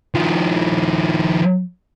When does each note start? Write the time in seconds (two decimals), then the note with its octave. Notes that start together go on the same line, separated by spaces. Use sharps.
0.15 D#3 F3